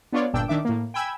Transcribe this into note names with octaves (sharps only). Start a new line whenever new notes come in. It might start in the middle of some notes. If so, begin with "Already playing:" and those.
B3 D4 F4 C#5 D5
G1 G2 A#2 D4 G5 E6
D#3 D4 E5 D6
A2 A#3
G5 G#5 B5 E6 G#6